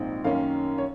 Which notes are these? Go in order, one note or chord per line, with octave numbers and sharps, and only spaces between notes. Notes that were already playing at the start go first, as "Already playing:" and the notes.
Already playing: A#1 G#2 F3 C4 D#4
F#2 D#3 A#3 C#4 F5
C#5